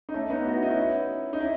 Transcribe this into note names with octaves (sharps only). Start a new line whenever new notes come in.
D#4
A3 C#4
B3 D#4
F#4
E4
D#4
C#4 E4
D#4
C#4 E4